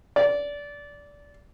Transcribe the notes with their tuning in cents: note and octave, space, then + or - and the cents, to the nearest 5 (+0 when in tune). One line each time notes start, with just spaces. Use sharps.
D5 -20